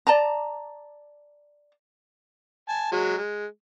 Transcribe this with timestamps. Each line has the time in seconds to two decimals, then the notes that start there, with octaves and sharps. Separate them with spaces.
0.07 D5 A5 A#5
2.69 G#5 A5
2.92 F#3 G#3
3.18 G#3